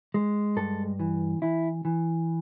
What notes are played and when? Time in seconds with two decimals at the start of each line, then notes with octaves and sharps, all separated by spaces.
0.14 G#3
0.56 G2 A4
0.99 E3
1.42 E3 E4
1.85 E3